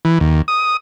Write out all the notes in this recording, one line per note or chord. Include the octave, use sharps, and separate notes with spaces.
E3
D#2
D#6